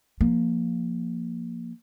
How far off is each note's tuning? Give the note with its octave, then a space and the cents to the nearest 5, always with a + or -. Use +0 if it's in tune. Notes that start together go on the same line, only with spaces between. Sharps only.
F3 +0 A#3 +0